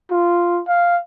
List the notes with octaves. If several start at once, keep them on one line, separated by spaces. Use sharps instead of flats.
F4
F5